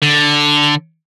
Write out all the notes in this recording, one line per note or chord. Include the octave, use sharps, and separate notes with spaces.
D3